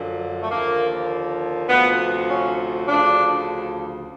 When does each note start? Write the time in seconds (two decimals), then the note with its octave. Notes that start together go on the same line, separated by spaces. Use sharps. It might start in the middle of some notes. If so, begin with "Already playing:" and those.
Already playing: F#2 D3 F3
0.43 A3
0.51 D#2 D3 F3 A#3
1.69 D2 C3 F3 B3
2.29 C#4
2.88 D2 C#3 F3 D4